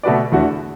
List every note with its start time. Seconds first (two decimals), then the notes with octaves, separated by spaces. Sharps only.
0.03 B2 A3 F#4 B4 D5
0.32 E2 D3 A3 F#4